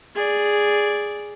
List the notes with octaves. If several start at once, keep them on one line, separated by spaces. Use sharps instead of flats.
G#4 D5